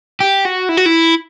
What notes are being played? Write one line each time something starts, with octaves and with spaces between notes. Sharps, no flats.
G4
F#4
E4
F#4
E4